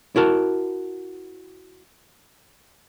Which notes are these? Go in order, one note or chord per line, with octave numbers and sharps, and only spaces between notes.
E4 F#4 A#4 A5